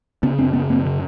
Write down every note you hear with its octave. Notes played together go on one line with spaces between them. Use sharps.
C#3 B3 C#4
F#2 C4 D4
C#3 B3 C#4
F#2 A#3 C4
C#3